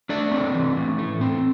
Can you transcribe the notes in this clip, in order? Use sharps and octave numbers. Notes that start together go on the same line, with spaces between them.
A3 D4 D5
C4
E3
A2
A3
C4